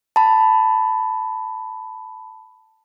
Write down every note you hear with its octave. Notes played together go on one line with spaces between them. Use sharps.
A5 B5